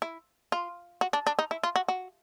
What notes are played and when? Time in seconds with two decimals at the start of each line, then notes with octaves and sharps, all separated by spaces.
0.02 E4
0.52 F4
1.01 F#4
1.13 D4
1.27 D4
1.39 D#4
1.51 E4
1.63 F4
1.76 F#4
1.88 F#4